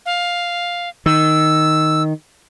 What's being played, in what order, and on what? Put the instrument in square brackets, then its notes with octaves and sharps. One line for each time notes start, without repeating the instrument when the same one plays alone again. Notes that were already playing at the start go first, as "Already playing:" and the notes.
[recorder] F5
[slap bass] D#3 [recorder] E6